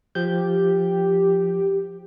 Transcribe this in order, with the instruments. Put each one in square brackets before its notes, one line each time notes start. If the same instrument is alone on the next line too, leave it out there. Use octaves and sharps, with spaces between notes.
[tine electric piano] F3 G6 [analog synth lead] G4